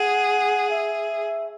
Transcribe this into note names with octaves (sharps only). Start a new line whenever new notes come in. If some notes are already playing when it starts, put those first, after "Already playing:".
Already playing: G#4 F#5
E5